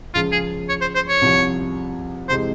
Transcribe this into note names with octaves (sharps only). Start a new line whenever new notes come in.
C#2 C#3 F3 F4
G#4
C#5
C5
C5
C#5
C2 C3 F3
F2 C3 E3 G#3 C5